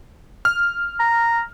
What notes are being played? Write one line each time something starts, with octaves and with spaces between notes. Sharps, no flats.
F6
A#5